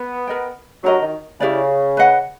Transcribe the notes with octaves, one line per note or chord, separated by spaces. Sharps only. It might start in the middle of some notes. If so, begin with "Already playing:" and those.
Already playing: B3
A#4 D#5 G5
F#3 D4 G4 A#4 D#5
D#3
C#3 E4 G4 B4 D5
B4 D#5 F#5